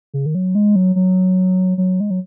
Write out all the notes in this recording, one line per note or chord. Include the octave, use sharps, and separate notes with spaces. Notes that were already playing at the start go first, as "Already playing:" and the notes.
C#3
D#3
F#3
G#3
F#3
F#3
F#3
G#3
F#3